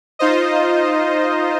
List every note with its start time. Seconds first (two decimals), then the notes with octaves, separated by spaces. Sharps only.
0.19 D#4 F4 C5 D#5